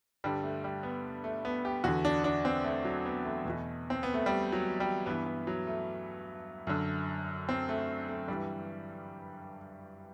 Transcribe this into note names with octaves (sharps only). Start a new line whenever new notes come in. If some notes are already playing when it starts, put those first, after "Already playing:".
G2 D3 G3
A3
G3
B3
A3
B3
G4
E2 D3 F#4
D4
D4
C4
A3
F#3
B3
A3
E2 B2
C4
B3
A3
G3
F#3
G3
G2 E3 B3
B3
F#3
A3
F#2 D3
C4
A3
A3
G2 E3 G3